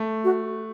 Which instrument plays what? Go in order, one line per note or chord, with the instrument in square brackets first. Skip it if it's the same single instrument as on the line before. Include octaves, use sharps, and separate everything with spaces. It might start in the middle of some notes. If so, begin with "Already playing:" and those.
Already playing: [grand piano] A3
[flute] F#4